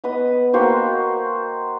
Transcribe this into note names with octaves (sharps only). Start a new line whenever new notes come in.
B3 B4 D#5 D#6
A#3 F#4 C5 G5